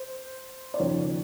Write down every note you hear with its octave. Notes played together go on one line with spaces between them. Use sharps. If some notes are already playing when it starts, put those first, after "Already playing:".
Already playing: C5
D5
D#2 C#3 F3 C#5